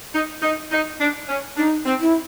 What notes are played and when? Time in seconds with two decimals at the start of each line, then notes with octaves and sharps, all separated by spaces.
0.15 D#4
0.43 D#4
0.72 D#4
1.01 D4
1.29 C#4
1.57 D4 D#4
1.86 C4
2.00 E4